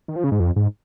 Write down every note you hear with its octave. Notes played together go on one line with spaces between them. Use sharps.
D#3
F3
C#3
G#2
F2
G#2